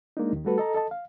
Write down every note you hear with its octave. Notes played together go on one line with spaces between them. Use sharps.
G#3 A#3 D4 D#4
D#2 D#3
G3 A3 F#4 A4 B4
A4 D#5 A#5
A4 D#5 A5
F5